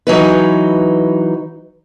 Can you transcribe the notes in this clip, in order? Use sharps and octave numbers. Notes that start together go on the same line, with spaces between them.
E3 F#3 D#4 B4